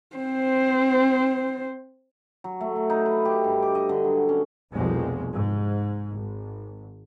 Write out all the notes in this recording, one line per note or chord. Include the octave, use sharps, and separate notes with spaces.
C4 C5
F#3
A3
F#3
D#4
B4
G4
G2
D6
D#5
D3
F#3
C#4
F1 C2 B2 F3 G#3
G#2
G#1